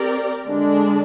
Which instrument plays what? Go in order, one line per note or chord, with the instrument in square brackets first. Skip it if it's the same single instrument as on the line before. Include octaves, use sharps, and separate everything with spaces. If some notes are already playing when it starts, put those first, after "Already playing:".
Already playing: [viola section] C4 G4 A#4 D5
D3 G#3 D4